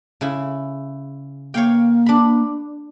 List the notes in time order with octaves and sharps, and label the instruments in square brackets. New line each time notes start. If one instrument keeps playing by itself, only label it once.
[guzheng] C#3 E4
[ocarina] A#3 [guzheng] C#5 F5 G5
[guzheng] D4 B5